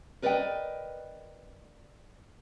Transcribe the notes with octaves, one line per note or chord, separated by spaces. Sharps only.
A#4 B4 D5 D#5 F5 G5